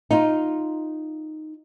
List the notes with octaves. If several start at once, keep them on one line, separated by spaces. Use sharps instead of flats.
D#4 F4